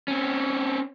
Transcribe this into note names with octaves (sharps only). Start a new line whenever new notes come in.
C4 C#4